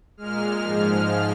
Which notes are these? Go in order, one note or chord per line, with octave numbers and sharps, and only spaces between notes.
A#2 G#3 F6
G#2 F3 G#3 F6